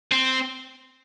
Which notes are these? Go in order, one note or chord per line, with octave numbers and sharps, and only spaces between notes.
C4